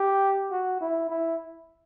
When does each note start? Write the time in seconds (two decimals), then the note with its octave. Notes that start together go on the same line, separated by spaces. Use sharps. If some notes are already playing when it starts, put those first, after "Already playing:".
Already playing: G4
0.51 F#4
0.81 E4
1.09 E4